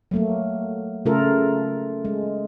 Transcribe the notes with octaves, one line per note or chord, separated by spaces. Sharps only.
F#3 A3 A#3
C#3 A3 F4 A4 A#4
G#3